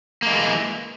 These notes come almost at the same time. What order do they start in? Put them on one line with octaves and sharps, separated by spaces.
A#3 G#3 E3